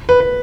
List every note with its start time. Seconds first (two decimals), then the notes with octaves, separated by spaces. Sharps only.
0.09 B4
0.20 B4